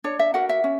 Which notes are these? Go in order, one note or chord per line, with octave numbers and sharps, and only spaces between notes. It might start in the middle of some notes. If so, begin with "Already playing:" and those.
D4 C#5
E5
F#4 A#4 F#5
E5
C#4